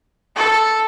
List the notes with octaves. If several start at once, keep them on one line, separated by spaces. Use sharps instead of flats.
A4